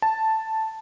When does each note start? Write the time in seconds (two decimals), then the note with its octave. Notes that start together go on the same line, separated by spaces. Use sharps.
0.02 A5